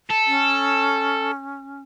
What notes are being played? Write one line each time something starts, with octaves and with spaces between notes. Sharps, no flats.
A4
C#4